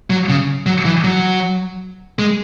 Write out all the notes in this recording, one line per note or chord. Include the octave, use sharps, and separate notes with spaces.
F#3
C#3
F#3
E3
F#3
G#3